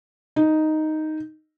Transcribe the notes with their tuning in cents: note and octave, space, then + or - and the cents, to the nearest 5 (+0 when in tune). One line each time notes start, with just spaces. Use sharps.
D#4 +0